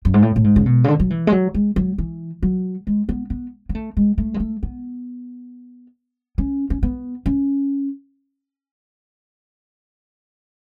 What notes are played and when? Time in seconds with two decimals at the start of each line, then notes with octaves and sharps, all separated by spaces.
0.05 F#2
0.14 G#2
0.22 A2
0.36 A2
0.44 G#2
0.56 C#3
0.66 B2
0.84 C#3
0.88 D3
1.00 F#3
1.10 E3
1.27 G#3
1.32 F#3
1.54 G#3
1.76 F#3
1.98 E3
2.43 F#3
2.87 G#3
3.09 B3
3.30 B3
3.69 B3
3.75 A3
3.97 G#3
4.18 A3
4.34 G#3
4.40 A3
4.63 B3
6.38 C#4
6.70 C#4
6.83 B3
7.26 C#4